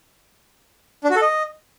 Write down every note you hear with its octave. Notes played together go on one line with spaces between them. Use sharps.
D4
F#4
A4
D#5